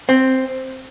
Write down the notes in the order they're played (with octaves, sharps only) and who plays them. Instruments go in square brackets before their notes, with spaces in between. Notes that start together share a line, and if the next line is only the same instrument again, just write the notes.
[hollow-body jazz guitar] C4